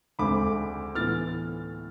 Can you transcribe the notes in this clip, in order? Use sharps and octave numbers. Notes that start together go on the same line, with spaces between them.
D2 D3 G#3 C4 B5 D6
A2 E3 B3 F6 A6